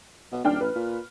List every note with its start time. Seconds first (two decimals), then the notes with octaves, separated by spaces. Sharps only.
0.32 B2
0.44 D#1 D4 G5 F6
0.61 A1 B4
0.75 A#2